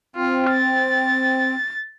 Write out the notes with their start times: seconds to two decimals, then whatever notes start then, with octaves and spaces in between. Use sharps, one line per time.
0.16 C4 F4
0.50 A6